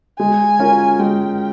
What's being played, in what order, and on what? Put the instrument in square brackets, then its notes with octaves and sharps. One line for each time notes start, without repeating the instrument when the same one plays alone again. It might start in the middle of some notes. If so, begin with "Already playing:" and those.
[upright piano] G#3 [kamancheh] G#5
[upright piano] C#4 F4 A#4
[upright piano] G#3 [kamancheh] G5